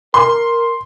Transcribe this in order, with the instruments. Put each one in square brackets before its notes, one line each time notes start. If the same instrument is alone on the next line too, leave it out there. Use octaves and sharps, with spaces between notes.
[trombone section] A#4 [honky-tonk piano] C6